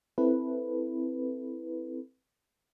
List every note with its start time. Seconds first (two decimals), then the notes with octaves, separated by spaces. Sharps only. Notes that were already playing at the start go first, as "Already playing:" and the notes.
0.18 C4 E4 A4 B4